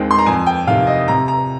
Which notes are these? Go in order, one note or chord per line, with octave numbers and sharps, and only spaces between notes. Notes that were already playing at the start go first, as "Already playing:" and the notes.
Already playing: D#2 D#3 G#3 C4
C6
A#5
F2 G#5
G5
C3 D#3 F5
D#5
C3 A#5
A#5